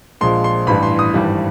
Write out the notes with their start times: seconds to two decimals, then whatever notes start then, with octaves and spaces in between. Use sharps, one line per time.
0.21 A#1 A#2 F3 G#3 C6
0.44 C6
0.67 A1 G2 E3 B5
0.83 C6
0.99 D#6
1.14 G#1 G2 E3 G3